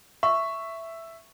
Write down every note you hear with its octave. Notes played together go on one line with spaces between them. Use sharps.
E5 C#6